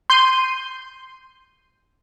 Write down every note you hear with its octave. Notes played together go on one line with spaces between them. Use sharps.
C6 G6 C7 D#7